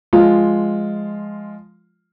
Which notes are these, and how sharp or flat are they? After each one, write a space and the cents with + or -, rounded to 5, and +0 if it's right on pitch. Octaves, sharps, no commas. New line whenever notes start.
F3 +0 G#3 +0 F4 +0